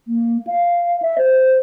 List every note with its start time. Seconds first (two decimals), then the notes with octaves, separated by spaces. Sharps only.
0.08 A#3
0.47 F5
1.02 E5
1.18 C5